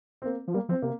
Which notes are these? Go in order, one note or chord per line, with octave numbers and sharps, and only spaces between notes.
C4
A#3
F3
G3 A#3
F3 C4
C3 A#3